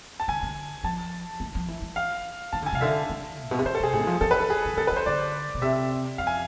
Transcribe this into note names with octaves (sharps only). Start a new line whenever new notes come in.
A5
D3 G#5
D3
F3 A5
E3
F3
E3
E3
F5
E3 A5
D3 G#5
C3 F5
D3 E5
E3
A2
B2
C3
D3 C5
A4
C3 G#4
A2 G#4
E3
F3
E3 A4
B4
A4
G#4
E3
D3 A4
B4
E3
C5
D3 D5
B2
C3 E5
F2 F5
G#5